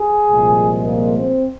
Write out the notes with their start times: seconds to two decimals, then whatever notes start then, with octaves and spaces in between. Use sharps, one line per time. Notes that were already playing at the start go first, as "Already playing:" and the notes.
Already playing: G#4
0.28 C2 A#2 F3 G#3
0.86 A#3
1.17 C4